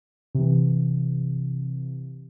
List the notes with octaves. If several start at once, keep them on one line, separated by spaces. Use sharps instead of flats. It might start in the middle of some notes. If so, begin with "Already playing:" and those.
C3 E3